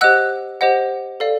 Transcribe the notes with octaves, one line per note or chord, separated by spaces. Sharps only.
G4 C5 D#5 F#5 E6 F#6
G4 C5 D#5 F#5
A4 D5 F5